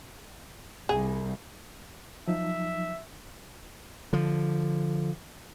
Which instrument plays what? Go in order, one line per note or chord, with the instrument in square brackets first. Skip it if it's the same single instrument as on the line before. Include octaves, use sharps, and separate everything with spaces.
[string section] C2 [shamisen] G#4
[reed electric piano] F3 F#3 D#4 [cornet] E5
[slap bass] D3 F3